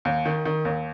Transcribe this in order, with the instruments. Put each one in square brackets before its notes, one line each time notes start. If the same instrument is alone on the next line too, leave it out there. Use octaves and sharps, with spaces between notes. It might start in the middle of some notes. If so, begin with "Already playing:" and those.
[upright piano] D#2
D#3
D#3
D#2